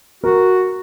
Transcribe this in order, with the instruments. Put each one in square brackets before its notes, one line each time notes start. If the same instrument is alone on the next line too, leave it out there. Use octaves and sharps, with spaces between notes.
[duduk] F#4 [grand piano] A#4